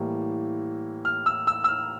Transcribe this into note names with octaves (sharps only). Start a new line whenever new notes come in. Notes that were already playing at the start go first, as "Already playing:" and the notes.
Already playing: A2 E3 G3 A#3
F6
E6
E6
E6
F6